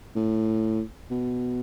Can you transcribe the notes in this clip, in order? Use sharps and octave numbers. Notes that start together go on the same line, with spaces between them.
A2
B2